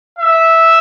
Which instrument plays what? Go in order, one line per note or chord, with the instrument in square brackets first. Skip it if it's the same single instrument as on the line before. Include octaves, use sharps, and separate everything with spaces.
[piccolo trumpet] E5